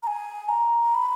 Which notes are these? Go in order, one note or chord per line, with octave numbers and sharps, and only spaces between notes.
A#5
G#5
A#5
B5